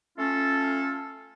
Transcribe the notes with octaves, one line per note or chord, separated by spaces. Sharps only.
A3 C#4 F4 A4